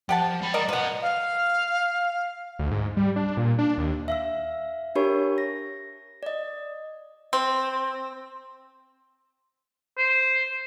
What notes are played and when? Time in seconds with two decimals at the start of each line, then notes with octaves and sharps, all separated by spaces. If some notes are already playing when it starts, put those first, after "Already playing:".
0.09 F3 G4 F#5 A5
0.41 G#3 B5
0.54 A#4 D5 D#5
0.69 F3 B4 D#5 F#5
1.02 F5
2.59 D2
2.71 G#2
2.97 G3
3.16 D4
3.37 A#2
3.59 D4
3.78 D#2
4.08 E5 F5 E6
4.95 D4 G4 A#4 C#5 B5 C#6
5.38 A#6
6.23 D5 D#5
7.33 C4
9.98 C5